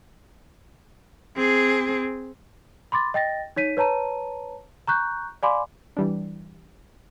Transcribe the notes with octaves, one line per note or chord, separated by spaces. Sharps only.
C4 G#4
B5 C6 D6 A6
D#5 G5 A6 A#6
D#4 C#5 B6 D#7
B4 C#5 A5 A#5 D#7
A#5 C#6 F#6 G6
D5 F5 G#5 B5 C6 D6
E3 G3 D4